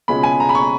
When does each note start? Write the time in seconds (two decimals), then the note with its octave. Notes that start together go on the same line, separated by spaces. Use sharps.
0.08 C#2 B2 G#3 C#4 B5
0.23 G#5
0.40 A#5
0.49 B5
0.55 C#6